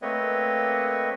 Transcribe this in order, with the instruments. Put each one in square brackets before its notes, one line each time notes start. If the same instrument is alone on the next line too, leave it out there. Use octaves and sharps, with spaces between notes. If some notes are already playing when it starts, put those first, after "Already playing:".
[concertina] A3 A#3 C4 B4 C#5 D#5